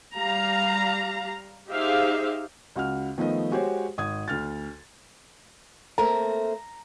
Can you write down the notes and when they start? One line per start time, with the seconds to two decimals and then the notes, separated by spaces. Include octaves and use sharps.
0.17 G3 F5 A#5
1.68 D#4 G4 G#4 C5 E5 F5
2.76 C#2 F#4 F#5 F6
3.18 D#3 F3 A3 B3 D#5
3.51 G#3 F#4 G4 C5 C#5
3.98 G#1 D#6 G#6
4.28 D2 F6 A6
5.98 A3 A#3 C4 A#5